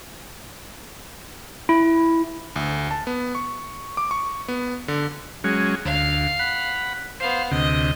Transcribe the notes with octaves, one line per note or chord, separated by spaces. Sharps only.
E4
D2
A5
B3
C#6
D6
C#6
B3
D3
F#3 G#3 C#4
D2 F5
F#5 B5
B3 C5 F5
D2 C3 D#5